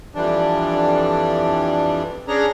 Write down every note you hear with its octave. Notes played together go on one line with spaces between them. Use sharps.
F2 E3 G3 D4
C#4 D4 G#4 A#5